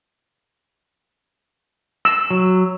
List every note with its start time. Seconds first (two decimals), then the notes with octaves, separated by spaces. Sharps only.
2.05 E6
2.30 F#3